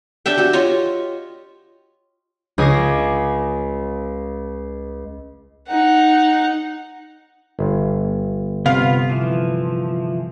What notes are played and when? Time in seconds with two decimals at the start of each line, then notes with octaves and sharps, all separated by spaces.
0.26 D4 G4 E5 G5
0.38 F#4 G4
0.53 F4 C#5 D#5
2.58 C#2 D#5 G#5 D6 A#6 C7
5.68 D#4 F#5
7.59 G1
8.66 C3 B3 F4 F5
9.10 E3 F3